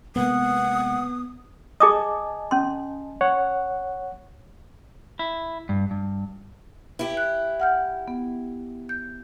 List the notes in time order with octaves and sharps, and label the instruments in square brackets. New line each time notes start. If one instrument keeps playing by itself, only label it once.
[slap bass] C3 G#3 A#3 [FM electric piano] B3 [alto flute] F#5 [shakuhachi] D#6
[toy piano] G#4 D6 D#6 [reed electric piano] D#5 G#5 A5
[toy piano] C#4 C6
[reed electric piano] C#5 F#5
[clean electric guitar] E4
G2
G2
[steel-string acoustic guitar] E4 G4
[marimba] F#6
F#5 F6 G6
B3
G6